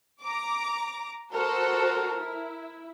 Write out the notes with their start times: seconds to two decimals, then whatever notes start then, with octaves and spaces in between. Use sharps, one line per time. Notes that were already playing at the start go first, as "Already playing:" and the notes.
0.22 A#5 D6
1.33 F#4 A4 A#4 C5
2.18 E4